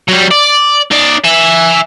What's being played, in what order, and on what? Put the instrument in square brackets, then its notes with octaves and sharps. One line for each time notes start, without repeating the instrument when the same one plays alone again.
[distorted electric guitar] F#3 G3
D5
D#4 D5
E5 G#5